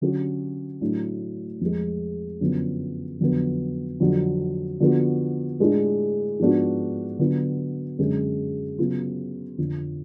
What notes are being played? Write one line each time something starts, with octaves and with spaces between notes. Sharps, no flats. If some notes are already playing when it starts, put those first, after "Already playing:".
D3 F#3 C#4 F#4
A2 F#3 A3 D4
F2 F3 G#3
F#2 D3 F3 B3
F2 D3 F#3 B3
F2 D3 F#3
D3 F3 B3 F#4
A2 G#3 D4 F4
G#2 F3 B3 D4 F#4
D3 F#3 B3 F4
F#2 D3 G#3 C#4
C#3 F#3 B3 F4
F2 D3 F3